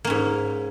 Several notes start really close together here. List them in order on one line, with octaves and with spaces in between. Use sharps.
A#3 C#4 G#2